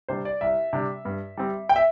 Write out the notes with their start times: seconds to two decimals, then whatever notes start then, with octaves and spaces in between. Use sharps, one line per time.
0.08 C3 G3 D4 C5
0.25 D5
0.41 C2 E5
0.73 C3 G3 D4
1.05 G2
1.37 G3 C4
1.69 G5
1.76 E5